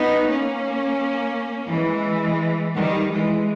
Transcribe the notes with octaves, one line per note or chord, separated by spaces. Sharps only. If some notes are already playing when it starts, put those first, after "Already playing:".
Already playing: B3 D#4
A#3 C#4
E3 G#3
D#3 G3
E3 G#3